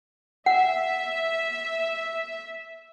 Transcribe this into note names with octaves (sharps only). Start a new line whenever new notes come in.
E5 F#5